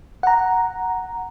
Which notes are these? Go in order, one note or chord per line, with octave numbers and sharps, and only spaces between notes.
F#5 A#5